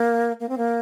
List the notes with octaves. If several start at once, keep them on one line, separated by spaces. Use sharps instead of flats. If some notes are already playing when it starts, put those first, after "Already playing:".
Already playing: A#3
A#3
C4
A#3